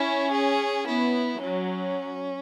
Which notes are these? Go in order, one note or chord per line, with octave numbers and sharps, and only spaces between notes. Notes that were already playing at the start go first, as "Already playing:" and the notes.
Already playing: C#4 E4
G#4
B3 E4
F#3 C#4